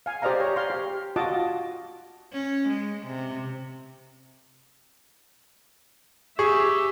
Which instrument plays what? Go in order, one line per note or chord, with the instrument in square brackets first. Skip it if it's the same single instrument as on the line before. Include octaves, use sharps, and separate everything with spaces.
[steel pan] F5 G#5
G4 C5 D5 D#5 F5 A#5
C#5 A#5
F5 C6
G4
F4 F#4 D#5 A5 D6
[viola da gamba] C#4
G#3
C3
[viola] G4 E5 [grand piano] G#4 [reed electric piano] C#6